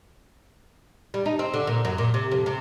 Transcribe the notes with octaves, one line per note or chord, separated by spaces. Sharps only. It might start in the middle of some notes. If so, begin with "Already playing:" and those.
G3
D#4
C4
D3
A#2
F#2
A#2
C3
F2
C3